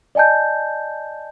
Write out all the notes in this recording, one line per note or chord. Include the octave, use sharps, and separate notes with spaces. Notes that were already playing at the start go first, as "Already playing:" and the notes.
D5 D#5 G#5 A5 G6